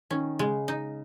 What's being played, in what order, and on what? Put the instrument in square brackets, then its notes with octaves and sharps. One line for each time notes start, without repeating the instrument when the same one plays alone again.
[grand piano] D#3 [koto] C#4
[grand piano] C#3 [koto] G#3
[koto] D#4